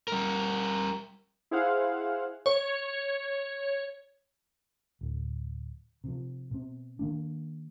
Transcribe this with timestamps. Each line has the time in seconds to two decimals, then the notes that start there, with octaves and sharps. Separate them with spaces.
0.08 G3 A#4
1.51 E4 G#4 C5 F5 F#5
2.46 C#5
5.01 D1
6.04 C3 F3
6.51 B2 C4
6.99 D#3 A#3 D4